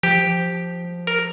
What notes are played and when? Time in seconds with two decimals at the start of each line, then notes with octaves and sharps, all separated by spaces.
0.03 F3 G4
1.07 A#4